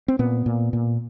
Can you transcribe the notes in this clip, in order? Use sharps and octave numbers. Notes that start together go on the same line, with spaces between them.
C4
A#2 B3
A#2
A#2